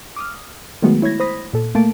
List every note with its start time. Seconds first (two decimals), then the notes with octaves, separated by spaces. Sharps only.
0.16 D6 D#6 F6
0.82 D#3 F#3 G#3 A3 B3 F#4
1.02 E4 C#5 B5 G#6 A#6
1.20 C5 B5 D#6 A#6 B6
1.53 A#2 A4
1.75 A3 A#3 A5 D7